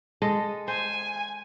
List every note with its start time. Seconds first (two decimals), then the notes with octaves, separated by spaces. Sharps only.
0.22 G#3 A4 D#5
0.68 C5 G#5